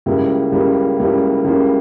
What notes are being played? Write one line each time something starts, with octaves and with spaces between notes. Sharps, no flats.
C#2 C#3 G3 A#3 E4
C#2 C#3 G3 A#3 E4
C#2 C#3 G3 A#3 E4
C#2 C#3 G3 A#3 E4